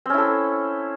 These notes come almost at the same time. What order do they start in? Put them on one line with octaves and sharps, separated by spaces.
C4 C#4 E4 A4